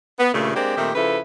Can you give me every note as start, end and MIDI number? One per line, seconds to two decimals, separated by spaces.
0.19 0.30 59
0.33 0.54 43
0.33 0.54 46
0.33 0.54 49
0.33 0.54 57
0.55 0.76 56
0.55 0.76 58
0.55 0.76 60
0.55 0.76 62
0.55 0.76 67
0.76 0.89 46
0.76 0.89 51
0.76 0.89 57
0.76 0.89 60
0.76 0.89 67
0.95 1.18 49
0.95 1.18 53
0.95 1.18 64
0.95 1.18 69
0.95 1.18 71